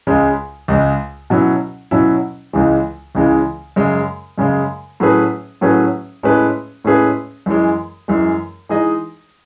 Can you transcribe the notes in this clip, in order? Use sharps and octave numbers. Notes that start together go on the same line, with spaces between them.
C#2 C#3 G#3
C#2 C#3 G#3
B2 F#3 C#4 E4
B2 F#3 C#4 E4
C#2 C#3 E3 G#3
C#2 C#3 E3 G#3
F#2 C#3 G#3
F#2 C#3 G#3
A2 F#3 C#4 G#4 B4
A2 F#3 C#4 G#4 B4
A2 G#3 C#4 G#4 B4
A2 G#3 C#4 G#4 B4
F#2 E3 G#3
F#2 E3 G#3
E3 G#3 D#4 G#4 D#5